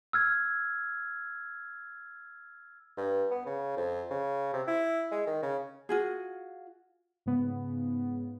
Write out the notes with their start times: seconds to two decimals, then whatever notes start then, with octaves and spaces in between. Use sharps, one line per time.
0.13 E6 F6 G#6
2.98 G2
3.31 B3
3.46 C#3
3.77 F2
4.10 C#3
4.53 C3
4.67 E4
5.12 G#3
5.27 D#3
5.43 C#3
5.89 F4 F#4 G#4
7.26 G#2 C#3 B3